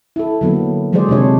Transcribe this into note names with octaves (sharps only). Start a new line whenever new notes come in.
E4 A4
D3 F#3 A#3 B3
F3 F#3 G#3 G#4 C5 D5
C3 D#3 D4 C#5